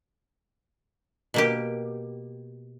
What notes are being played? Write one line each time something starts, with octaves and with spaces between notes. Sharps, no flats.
B2 A#3 G4